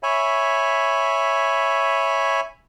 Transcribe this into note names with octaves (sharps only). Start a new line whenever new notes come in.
C#5 E5 G#5 B5